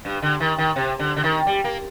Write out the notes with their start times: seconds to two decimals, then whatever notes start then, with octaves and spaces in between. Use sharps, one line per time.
0.05 G2
0.22 D3
0.40 D#3
0.58 D#3
0.76 C3
0.99 D3
1.16 D3
1.23 D#3
1.47 G3
1.64 A#3